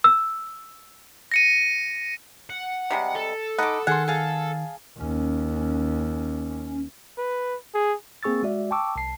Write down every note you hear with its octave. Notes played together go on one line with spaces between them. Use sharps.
E6
A#6 C#7 D#7
F#5
C3 G3 G#3
A4
D#4 F#5 A5 B5 D6 D#6
D#3 G#4 F#5 C6 F6
G#4 F5 A5
D#2 C#4
B4
G#4
A#3 C4 G#4 C#6 E6 A6
G#3 F#4 D5 E5
G5 A5 C#6 D6 E6
C2 A5 C7